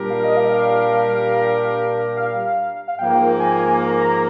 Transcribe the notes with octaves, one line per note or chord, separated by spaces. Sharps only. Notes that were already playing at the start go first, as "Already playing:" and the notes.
Already playing: A#2 G3 D4 G4 A#4
F5
D#5
F5
F5
F5
F5
G#2 F3 A#3 G5
G#5
A#5
A#5